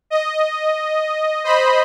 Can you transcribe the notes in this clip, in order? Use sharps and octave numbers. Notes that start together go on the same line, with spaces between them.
D#5
C5 D#5 B5